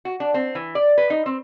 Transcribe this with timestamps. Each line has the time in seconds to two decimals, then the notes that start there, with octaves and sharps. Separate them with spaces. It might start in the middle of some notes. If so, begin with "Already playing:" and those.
0.05 F#4
0.20 D4
0.34 C4
0.55 E3
0.75 D5
0.98 B4
1.10 D#4
1.26 C4